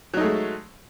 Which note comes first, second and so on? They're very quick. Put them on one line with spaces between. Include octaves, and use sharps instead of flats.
F#3 D#4 A3 G#3